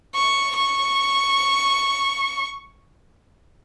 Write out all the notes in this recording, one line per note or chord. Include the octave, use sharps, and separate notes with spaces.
C#6
C#6